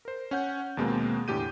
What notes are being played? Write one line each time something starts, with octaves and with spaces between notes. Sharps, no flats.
A#4 C5
C#4 F#5 G6
D#2 B2 G#3 A#3 C4
E2 A2 D3 G4 G6 D#7